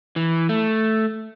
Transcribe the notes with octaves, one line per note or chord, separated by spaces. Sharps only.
E3
A3